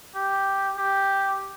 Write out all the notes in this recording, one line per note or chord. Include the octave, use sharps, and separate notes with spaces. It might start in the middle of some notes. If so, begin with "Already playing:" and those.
G4
G4